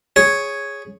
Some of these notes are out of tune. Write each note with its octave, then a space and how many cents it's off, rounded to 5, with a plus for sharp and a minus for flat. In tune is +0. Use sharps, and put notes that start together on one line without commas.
G#4 +0 C#5 +0